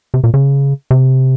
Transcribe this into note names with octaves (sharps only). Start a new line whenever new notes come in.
C3
A#2
C#3
C3